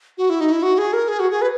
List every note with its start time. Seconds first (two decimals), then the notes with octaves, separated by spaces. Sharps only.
0.18 F#4
0.30 E4
0.41 D#4
0.52 E4
0.63 F#4
0.78 G#4
0.93 A#4
1.08 G#4
1.20 F#4
1.31 G#4
1.42 B4